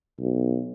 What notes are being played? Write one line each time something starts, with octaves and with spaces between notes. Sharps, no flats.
B1